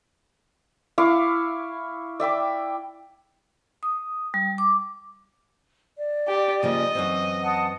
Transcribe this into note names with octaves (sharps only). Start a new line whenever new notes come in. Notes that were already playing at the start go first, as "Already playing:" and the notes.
E4 F5 C#6 D6
D5 E5 G5 D6
D#6
G3
D6
D5
G4
C#3 F3 A#3 D#5
F#2 E3 C4
F#5 A5 D#6